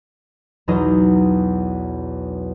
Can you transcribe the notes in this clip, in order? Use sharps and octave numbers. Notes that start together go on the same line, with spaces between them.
B1 E2 F#3 D#4 D#5